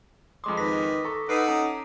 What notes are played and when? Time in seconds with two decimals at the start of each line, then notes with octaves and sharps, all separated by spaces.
0.44 F2 G#3 C6 D6 D#6
0.57 D#3 B4 A#6 B6
1.04 A4 A#5 C#6
1.29 D#4 A4 B4 F#5 C7 D7
1.48 C#4 A#5